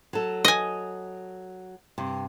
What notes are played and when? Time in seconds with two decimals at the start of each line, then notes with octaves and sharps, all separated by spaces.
0.13 F#3 A4
0.45 D#5 G#5
1.98 G2 C3